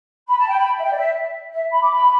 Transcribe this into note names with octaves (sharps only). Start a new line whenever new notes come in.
B5
A5
G5
B5
E5
G5
D5
E5
E5
B5
D6
B5